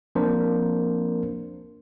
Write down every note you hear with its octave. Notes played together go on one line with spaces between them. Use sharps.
F3 A#3 C4 D4 A#4 C5